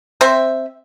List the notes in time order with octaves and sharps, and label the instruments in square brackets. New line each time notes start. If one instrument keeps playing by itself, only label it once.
[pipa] C4 C5 E5